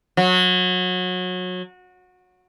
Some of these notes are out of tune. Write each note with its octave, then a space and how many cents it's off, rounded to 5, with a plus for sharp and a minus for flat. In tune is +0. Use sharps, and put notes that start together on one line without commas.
F#3 -25